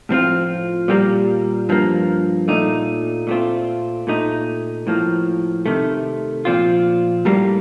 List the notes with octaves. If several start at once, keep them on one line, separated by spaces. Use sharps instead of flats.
A2 F3 C4 F4
A#2 G3 A#3
G2 F3 A#3
A#2 A3 D#4
A#2 A3 C4 F4
A#2 A3 D#4
A2 F3 A#3
C3 D#3 A3
A#2 F3 C4 F4
A2 G3 A#3